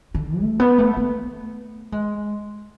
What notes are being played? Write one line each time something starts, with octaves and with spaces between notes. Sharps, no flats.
D3
A3
B3
A3
A3
G#3